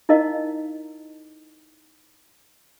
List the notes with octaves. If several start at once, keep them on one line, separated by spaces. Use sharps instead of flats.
D#4 E4 A#4 D#5 F5